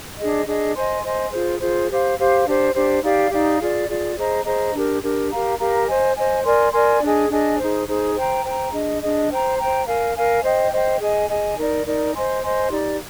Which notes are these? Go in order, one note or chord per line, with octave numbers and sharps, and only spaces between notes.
D4 G#4 D#5
D4 G#4 D#5
C5 D#5 G#5 C6
C5 D#5 G#5 C6
F4 G#4 C5
F4 G#4 C5
G4 C5 F5
G4 C5 F5
D4 G4 C5
D4 G4 C5
D#4 G4 D5 F5
D#4 G4 D5 F5
F4 G#4 D5
F4 G#4 D5
G#4 C5 D#5 A#5
G#4 C5 D#5 A#5
D4 G4 A#4
D4 G4 A#4
G4 A#4 F5 A#5
G4 A#4 F5 A#5
C5 D#5 G#5
C5 D#5 G#5
A#4 D5 G#5 C6
A#4 D5 G#5 C6
D4 G#4 D#5 G#5
D4 G#4 D#5 G#5
D#4 G#4 C5
D#4 G#4 C5
C5 G5 A#5
C5 G5 A#5
D4 G#4 D#5
D4 G#4 D#5
C5 G5 A#5
C5 G5 A#5
A#4 F5 G#5
A#4 F5 G#5
C5 D#5 G5
C5 D#5 G5
G#4 D#5 G#5
G#4 D#5 G#5
D#4 A#4 D5
D#4 A#4 D5
C5 D#5 G#5 C6
C5 D#5 G#5 C6
D#4 G4 D5